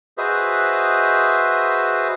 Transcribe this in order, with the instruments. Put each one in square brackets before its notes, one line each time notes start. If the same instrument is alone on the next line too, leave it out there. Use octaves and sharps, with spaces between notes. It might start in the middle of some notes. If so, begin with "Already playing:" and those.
[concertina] F#4 G#4 B4 C5 D#5 E5